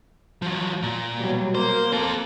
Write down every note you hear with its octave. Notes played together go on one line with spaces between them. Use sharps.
F3 F#3
A#2
B2 F#3 G3
A#3 C5
C4 A4